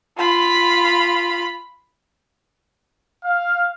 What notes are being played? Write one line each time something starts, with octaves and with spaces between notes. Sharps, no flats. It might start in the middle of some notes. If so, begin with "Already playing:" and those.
F4 B5
F5